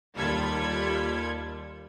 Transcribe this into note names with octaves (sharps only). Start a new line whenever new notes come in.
D#2 G3 F4 A4 B5 G#6